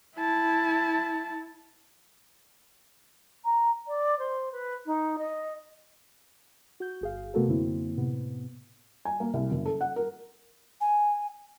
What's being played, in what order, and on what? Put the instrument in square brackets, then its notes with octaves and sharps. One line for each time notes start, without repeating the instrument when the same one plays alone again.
[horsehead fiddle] E4 A5
[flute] A#5
D5
C5
B4
D#4
D#5
[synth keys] F#4 G6
G1 G#4 F5
C3 A3 B3 F#4 A4 A#4
F#2 D3 A#3 C4 E4
A2 C3 B3
[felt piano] G#5
A#3
C2
F#1
A4
F#5
A#4
[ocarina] G#5